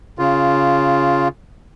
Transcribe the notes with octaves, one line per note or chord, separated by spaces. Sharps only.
C#3 F4